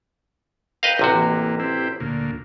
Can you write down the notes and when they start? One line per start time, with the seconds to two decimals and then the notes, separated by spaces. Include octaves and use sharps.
0.83 A#4 B4 D#5 F5 G5
0.99 A1 C3 F#4
1.15 E3 A#3
1.59 C4 E4 G4
2.00 D2 A#2